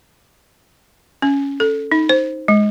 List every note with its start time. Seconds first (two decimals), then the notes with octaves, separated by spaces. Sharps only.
1.22 C#4
1.60 A4
1.92 D#4
2.09 C5
2.48 G#3